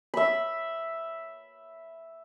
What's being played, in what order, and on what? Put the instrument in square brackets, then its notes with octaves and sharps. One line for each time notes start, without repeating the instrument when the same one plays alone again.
[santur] E5 B5